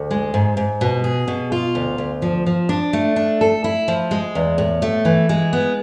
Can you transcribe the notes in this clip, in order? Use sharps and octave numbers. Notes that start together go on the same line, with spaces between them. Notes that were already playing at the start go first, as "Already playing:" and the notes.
Already playing: D2
G#3
G#2
G#2
B2
G#4
B2
F4
D2
D2
F3
F3
D4
A3
D4
A4
E4
F3
G#3
E2
A2
A3
E3
G#3
B3